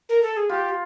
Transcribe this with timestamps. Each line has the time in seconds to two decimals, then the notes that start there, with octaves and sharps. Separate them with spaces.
0.09 A#4
0.23 A4
0.37 G#4
0.49 F4 G4